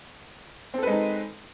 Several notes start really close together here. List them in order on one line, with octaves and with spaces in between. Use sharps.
C4 A4 B4 G#3 D#4